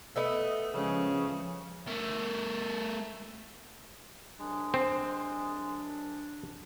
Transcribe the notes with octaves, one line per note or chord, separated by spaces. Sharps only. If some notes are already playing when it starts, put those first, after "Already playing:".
A3 B3 D#5 E5
C#3 F3 G#3 C#4
A3 A#4
C2 F#3 G#3 D4
C4